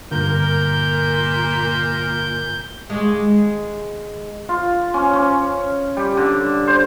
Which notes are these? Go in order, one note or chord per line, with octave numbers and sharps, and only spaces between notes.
G2 A#2 D3 A#4 G6
D#2 G#3
F4
C#4
C#4
G3
D3
C5